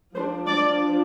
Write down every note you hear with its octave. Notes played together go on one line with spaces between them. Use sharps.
F3 C5
D4
D5